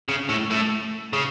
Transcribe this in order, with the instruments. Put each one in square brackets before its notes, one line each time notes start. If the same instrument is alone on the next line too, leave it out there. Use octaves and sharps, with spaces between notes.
[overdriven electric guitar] C#3
A2
A2
C#3